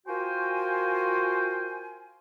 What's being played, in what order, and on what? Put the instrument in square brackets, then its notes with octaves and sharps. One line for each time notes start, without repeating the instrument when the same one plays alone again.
[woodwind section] F4 F#4 A#4 C5 G5 G#5